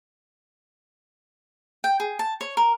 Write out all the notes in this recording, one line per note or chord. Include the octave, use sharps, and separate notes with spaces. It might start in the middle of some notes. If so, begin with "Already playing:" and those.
G5
G#4
A5
C#5
A#4